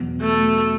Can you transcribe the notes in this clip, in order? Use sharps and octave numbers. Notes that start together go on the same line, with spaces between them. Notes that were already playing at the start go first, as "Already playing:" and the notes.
Already playing: E2 B2 F#3
A3